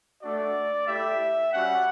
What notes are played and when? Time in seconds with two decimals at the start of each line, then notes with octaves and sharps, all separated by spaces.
0.21 A3 D4 F#4 D5
0.87 A3 E4 G4 E5
1.51 G3 C#4 F#4 F#5